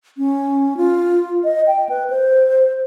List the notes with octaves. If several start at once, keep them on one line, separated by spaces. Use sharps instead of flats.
C#4
F4
D#5
G5
B4
C5